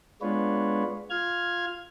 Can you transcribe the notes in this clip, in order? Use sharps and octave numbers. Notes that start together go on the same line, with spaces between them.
G#3 B3 D4 F4 B4 C#5
F4 F6 G#6